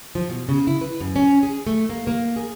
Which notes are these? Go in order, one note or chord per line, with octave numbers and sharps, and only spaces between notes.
F3
B2
C#3
E4
B4
F#2
C#4
G#4
A3
A#3
A#3
G#4